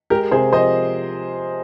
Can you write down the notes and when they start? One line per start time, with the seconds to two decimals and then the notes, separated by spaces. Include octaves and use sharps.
0.10 G#3 G4 A#4
0.31 C3 G#4 C5
0.53 F3 C5 D#5